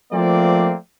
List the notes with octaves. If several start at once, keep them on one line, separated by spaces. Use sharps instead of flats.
F3 A3 A#3 C4 D5